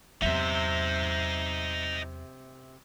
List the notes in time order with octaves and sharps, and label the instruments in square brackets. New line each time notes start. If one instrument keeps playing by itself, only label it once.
[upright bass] E2 F#3 [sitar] C3 E5 [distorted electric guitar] D#4 C5